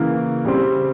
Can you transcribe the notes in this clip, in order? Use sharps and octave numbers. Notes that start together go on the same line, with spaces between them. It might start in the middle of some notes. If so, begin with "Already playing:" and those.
Already playing: C#3 E3 A#3
C#3 G3 C4